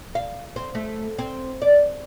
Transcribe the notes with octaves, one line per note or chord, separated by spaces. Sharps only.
F5
C4
A3
C4
D5